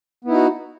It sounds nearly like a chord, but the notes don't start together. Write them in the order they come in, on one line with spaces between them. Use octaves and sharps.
B3 E4 D#4 F#4